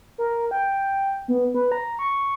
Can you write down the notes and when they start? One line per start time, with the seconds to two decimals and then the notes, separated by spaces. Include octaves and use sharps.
0.18 A#4
0.51 G5
1.28 B3
1.54 B4
1.72 A#5
1.99 C#6